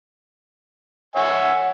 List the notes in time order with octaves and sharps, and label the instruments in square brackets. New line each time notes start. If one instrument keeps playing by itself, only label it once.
[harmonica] C#5 E5 G#5 [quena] F#5